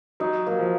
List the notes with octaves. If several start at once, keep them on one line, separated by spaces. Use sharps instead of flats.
F#3 D#4
F#3 A#3
F3